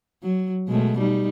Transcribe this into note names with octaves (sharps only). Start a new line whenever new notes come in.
F#3
B2 G#3 A3
G3 D#4